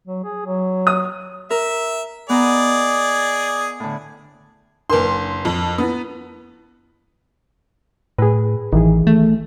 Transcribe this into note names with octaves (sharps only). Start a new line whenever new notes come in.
F#3
G#4
F#3
D#6
A#4 E5
B3 G#4 D5 D#5 A#5
A2 D3
F#1 D4 A#4 B4 C6
F2
B3 E4 F4 B5
A2 G#4 B4
A1 D#3 E3 G#4
A3